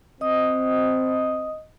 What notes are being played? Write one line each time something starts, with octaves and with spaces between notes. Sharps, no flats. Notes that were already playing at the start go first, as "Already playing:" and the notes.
C4 D#5 D#6